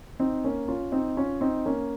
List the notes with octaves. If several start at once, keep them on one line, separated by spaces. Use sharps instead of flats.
C4 D#4
A#3 C#4
C#4 F4
C4 D#4
C#4 F4
C4 D#4
A#3 C#4